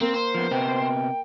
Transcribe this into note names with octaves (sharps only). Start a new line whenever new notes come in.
A#3 C4
C5
F3 B3
C3 B3 G5